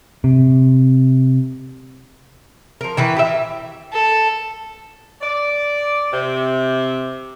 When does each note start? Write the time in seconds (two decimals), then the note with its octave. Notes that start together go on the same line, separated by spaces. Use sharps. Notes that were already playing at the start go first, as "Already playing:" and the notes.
0.24 C3
2.81 F3 A#4
2.97 D#3 E3 B4
3.16 G4 E5
3.93 A4
5.22 D5
6.13 C3